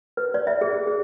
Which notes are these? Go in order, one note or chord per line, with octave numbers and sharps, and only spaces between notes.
B4
D5
E5
G#4
G#4